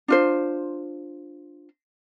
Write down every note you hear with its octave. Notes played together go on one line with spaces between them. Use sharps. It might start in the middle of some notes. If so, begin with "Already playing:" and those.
D4 F4 C5